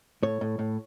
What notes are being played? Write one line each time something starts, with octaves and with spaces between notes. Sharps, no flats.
A2 C#5
A2
A2